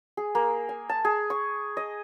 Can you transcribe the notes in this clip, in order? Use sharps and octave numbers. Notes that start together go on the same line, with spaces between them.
G#4
A#3
G#5
A5
G#4
C#6
D#5